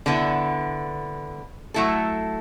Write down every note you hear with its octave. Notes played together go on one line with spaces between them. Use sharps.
D3 B3 E4
F#3 A3 E4 A4